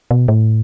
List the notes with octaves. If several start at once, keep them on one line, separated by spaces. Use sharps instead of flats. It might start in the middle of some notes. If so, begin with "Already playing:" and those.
B2
A2